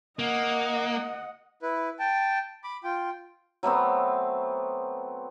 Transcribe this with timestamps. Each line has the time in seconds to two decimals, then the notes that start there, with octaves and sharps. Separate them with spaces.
0.19 A#3 D#5 F#5
1.62 E4 B4
1.99 G5 A5
2.64 B5 D6
2.84 F4 G5
3.63 F#3 A3 B3 C4